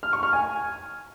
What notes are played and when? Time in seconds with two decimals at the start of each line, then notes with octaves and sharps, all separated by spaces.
0.03 F6
0.13 C#6
0.23 F6
0.33 G#5